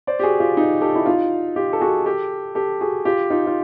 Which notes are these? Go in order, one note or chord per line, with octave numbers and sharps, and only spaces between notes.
C5 D5
G4
F#4 G#4
F4 G4
D#4 F4
G4 A4
E4
D#4 F4
F4 G4
A4
F#4 G#4
G4 A4
G4 A4
F#4 G#4
F4 G4
D#4 F4
F4